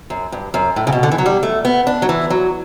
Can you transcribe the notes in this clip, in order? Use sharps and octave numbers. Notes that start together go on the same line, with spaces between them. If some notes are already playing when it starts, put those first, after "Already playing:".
F#2
G2
F#2
A2
C#3
B2
D3
E3
F#3
G3
A3
B3
D4
F#3
E3
F#3